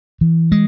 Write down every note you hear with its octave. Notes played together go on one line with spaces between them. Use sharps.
E3
G#3